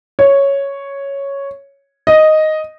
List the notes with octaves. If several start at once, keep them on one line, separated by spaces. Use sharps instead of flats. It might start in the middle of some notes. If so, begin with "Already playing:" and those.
C#5
D#5